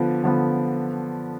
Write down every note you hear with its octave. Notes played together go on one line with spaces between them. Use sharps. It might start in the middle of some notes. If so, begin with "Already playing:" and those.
Already playing: D3 F3 B3
D3 F3 B3